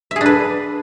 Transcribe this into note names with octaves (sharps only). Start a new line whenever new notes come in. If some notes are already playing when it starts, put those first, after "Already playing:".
D4 G#4 B4 E5